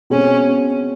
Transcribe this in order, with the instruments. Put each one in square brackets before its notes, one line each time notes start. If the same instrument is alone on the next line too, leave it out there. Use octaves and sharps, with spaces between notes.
[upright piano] B2 G#3 C4 [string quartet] C#4